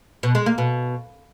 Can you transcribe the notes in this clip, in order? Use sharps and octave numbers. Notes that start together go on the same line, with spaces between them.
B2
G#3
A#3
B2